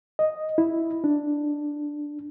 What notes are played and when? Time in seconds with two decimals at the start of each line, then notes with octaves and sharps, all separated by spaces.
0.19 D#5
0.58 E4
1.04 D4